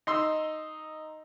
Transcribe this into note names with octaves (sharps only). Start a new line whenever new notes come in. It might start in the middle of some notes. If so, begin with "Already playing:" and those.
D#4 C6 E6